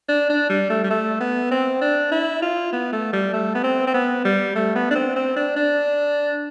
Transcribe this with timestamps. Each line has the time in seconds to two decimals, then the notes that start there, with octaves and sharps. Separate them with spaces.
0.09 D4
0.29 D4
0.49 G3
0.70 A3
0.84 G3
0.90 A3
1.20 B3
1.51 C4
1.81 D4
2.11 E4
2.42 F4
2.72 B3
2.93 A3
3.13 G3
3.33 A3
3.55 B3
3.64 C4
3.87 C4
3.94 B3
4.25 G3
4.55 A3
4.75 B3
4.91 D4
4.96 C4
5.16 C4
5.36 D4
5.56 D4